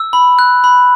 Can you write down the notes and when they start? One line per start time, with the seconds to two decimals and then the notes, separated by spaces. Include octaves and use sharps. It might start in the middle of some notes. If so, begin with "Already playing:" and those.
Already playing: E6
0.13 B5
0.39 F#6
0.64 B5